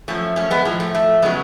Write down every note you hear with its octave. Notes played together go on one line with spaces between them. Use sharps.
F#2 F3 A3 C#4
A3 C#4
G#3 B3
A2 F3 G#3
A3
A3
C#3 F#3 G#3 B3